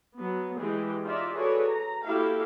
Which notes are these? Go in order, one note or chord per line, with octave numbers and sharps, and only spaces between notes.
F#3 B3
E3 G#3 G4 G#4
D#4 F4 D5 E5
F#4 G#4 A4 B4 C#5 D5
A#5
A#3 E4 F#4 G4 A4 F5